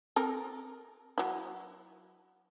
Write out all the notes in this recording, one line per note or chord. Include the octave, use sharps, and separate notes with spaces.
C4 A4 A#4
F#3 E4